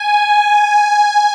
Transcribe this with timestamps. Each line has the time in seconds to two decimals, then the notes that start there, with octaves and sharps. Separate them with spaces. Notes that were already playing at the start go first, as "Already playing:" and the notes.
Already playing: G#5